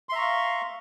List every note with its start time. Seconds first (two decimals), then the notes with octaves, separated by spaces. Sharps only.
0.09 C6
0.12 E5
0.15 A#5
0.18 C#6
0.21 F5